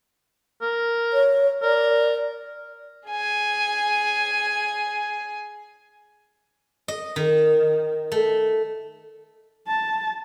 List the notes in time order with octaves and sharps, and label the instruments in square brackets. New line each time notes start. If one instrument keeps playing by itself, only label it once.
[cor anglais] A#4
[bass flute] C#5
[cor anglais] A#4 [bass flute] D5
[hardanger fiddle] G#4 G#5
[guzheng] D#5
D#3
A3
[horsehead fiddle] A5